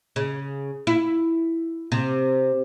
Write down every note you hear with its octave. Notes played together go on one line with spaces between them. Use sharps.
C#3
E4
C3